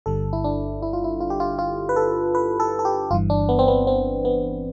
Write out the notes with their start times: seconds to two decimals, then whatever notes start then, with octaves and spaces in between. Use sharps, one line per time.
0.06 G1 G2 D3 G3 A4
0.33 E4
0.44 D4
0.82 E4
0.93 F4
1.04 E4
1.20 F4
1.30 G4
1.40 F4
1.59 F4
1.89 B4
1.96 A4
2.35 B4
2.60 A4
2.79 A4
2.85 G4
3.11 G1 G2 E3 F4
3.30 D4
3.49 B3
3.59 C4
3.68 B3
3.87 C4
4.25 B3